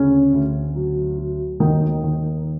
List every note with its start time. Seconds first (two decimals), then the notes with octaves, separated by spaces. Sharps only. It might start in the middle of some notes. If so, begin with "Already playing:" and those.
Already playing: D2 C#3 C#4
0.33 D2
0.75 F#3
1.18 F#3
1.60 D#2 D#3 D#4
2.04 D#3